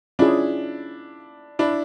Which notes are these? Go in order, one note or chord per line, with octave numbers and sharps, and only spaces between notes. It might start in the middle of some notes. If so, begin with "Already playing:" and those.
C#4 D4 E4 F4 G#4
D4 E4